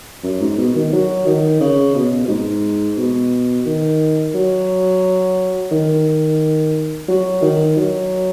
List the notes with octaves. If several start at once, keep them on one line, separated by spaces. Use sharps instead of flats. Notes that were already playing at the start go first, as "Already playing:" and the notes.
F#2
G#2
B2
D#3
F#3
D#3
C#3
B2
B2
G#2
B2
D#3
F#3
D#3
F#3
D#3
F#3